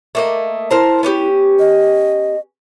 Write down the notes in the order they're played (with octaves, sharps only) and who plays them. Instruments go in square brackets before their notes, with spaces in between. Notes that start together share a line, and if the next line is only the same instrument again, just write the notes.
[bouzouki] A3 A#3 D#5
[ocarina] E4 [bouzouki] A#4 C5 A5
[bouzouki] B3 C#4 G4
[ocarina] D#5